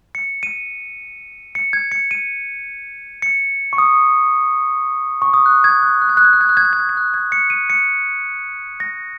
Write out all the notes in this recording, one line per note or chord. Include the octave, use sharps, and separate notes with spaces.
C#7
D#7
C#7
G#6
C#7
D#7
C#7
C#6
D#6
C#6
D#6
F#6
G#6
F#6
F#6
G#6
F#6
G#6
F#6
G#6
F#6
G#6
F#6
G#6
F#6
G#6
F#6
G#6
C#7
D#7
C#7
A#6